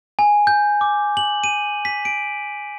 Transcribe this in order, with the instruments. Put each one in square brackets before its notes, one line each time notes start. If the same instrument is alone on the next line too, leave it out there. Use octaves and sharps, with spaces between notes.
[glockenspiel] G#5
G6
D6
F#7
D#7
B6
D7